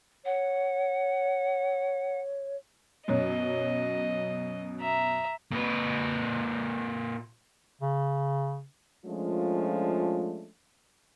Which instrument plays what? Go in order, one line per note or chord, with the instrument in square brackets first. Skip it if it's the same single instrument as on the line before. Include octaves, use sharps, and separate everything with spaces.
[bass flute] C#5 [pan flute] F#5
[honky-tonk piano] F#2 B2 F#3 [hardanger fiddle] D#5
[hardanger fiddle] E5 A#5
[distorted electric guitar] A#2 B4
[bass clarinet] C#3
[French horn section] F3 G#3 A3 C#4 D4 F4